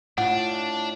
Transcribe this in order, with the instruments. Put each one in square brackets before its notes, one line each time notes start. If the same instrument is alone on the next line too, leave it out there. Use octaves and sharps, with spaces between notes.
[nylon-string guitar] A2 F4 [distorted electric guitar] D4 [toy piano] F#5